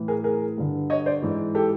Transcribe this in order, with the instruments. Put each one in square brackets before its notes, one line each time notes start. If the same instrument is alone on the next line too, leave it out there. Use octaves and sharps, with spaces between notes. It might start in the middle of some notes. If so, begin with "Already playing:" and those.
Already playing: [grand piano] A2 E3
G#4 A#4
G#4 A#4
G2 D3
C#5 D#5
C5 D5
G#2 E3
G4 A4